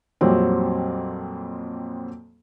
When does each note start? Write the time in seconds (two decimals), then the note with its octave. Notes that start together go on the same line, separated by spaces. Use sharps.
0.21 F2 A#2 F#3 G3 C4